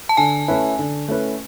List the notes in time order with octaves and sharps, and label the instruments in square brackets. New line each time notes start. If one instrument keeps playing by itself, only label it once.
[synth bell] A5
[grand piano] D3 [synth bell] G#5
[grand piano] A3 C#4 E4 B4
D3
A3 C#4 E4 B4